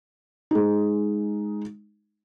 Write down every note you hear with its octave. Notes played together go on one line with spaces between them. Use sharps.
G#3 D#4